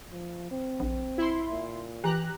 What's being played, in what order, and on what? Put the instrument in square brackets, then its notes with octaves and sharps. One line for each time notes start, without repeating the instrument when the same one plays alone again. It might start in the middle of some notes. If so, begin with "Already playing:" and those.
[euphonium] F3
C4
[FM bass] A#1
[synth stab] E4 C6
[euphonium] A#2
[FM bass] E3 [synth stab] G4 A#5 F#6